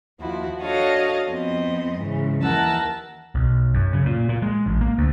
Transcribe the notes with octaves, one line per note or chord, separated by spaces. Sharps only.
D#2 F3 E4 F#4
D4 F#4 A4 C#5 D#5 F5
F2 B3 C4 D#5
G#2 C#3 E3
D#2 E3 A#4 F#5 A5 E6
B1
F#2
C#3
A#2
A#2
G#3
A1
A#3
D2